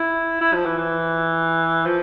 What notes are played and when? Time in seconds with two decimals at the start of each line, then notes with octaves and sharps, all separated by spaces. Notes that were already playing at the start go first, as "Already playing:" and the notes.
Already playing: E4
0.41 E4
0.53 F3
0.65 E3
0.77 E3
1.86 F3